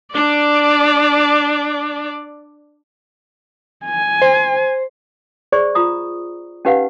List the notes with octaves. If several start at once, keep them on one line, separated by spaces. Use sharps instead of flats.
D4 D5
G#5
C5
G#4 C5 D5 C#6
F4 A#5 D#6
C#4 D#4 G4 B4 F5 F#5